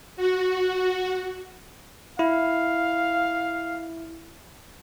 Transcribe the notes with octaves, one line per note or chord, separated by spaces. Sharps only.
F#4
E4 F5